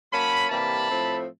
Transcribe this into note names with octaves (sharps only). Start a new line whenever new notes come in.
F#3 A#3 C#4 A5 B5
C3 E3 G3 A#3 A5 B5
A2 F3 A3 C4